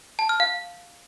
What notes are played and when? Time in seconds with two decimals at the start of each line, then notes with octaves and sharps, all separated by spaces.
0.19 A5
0.29 F6
0.40 F5